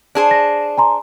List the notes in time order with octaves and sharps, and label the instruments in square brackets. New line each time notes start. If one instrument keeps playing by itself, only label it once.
[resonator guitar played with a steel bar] D4 G#4 C5
[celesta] A#6
G#5 A#5 C6